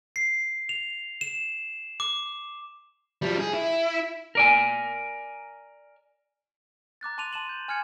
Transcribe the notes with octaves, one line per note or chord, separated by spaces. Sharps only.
C7
F7
E7
D6
F3 G3
G#4
E4
A#4 D5 G#5
A#5 D6 F#6 A6
A5 C6 D6 D#7 F7
A5 C6 E7 F#7
G6
G#5 F6 G#6 C#7